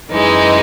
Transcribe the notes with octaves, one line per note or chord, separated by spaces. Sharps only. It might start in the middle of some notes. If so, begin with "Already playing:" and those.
F#2 E3 G#3 D#4